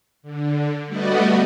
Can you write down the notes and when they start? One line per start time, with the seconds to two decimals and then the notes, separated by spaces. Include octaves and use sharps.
0.22 D3
0.87 G3 A3 B3 F#4 D5 D#5